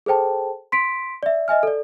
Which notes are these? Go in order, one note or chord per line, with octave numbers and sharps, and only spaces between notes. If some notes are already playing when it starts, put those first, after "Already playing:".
G#4 A4 C5 G5 A5
C6 B6 D7
D5 E5
D#5 E5 G#5 F6
A4 D5